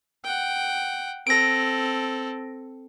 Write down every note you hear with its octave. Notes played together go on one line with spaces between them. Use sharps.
F#5 G5
C4 A4 A#6 D7